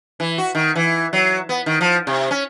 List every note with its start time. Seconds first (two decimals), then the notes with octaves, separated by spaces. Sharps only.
0.20 E3
0.38 F#4
0.55 D#3
0.76 E3
1.13 F#3
1.49 B3
1.66 D#3
1.81 F3
2.07 C3
2.31 C#4